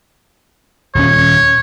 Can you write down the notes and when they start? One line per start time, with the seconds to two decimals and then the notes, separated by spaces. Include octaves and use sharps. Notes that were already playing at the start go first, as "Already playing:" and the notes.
0.95 D#1 C#4 C#5